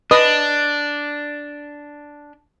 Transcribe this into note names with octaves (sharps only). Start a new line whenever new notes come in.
D4 B4 D#5 D#6